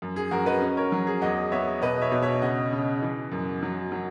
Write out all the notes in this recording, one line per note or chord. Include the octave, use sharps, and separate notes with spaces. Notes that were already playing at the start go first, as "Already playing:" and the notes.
F#2
G#4
F#2 F#4 A#4
B4 D#5
C#4
A#4 C#5
F#3
G#4
E2 D#5 F#5
B3 C#5 E5
B2 B4 D#5
C#5 E5
B2
C#5 E5
C#3 D#5 F#5
C#3
E3
F#2
F#3
F#3